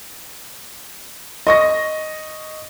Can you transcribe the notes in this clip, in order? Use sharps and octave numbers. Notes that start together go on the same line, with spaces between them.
D#5 C#6 A#6